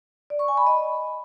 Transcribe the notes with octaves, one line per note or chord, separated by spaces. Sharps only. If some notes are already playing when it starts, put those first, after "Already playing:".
D5
C#6
G#5
B5
D#5